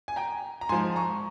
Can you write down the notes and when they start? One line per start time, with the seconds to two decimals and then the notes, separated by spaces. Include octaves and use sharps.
0.08 G#5
0.16 G5 A#5
0.61 A#5
0.69 G#2 F3 G#5 C6
0.96 A#5 C#6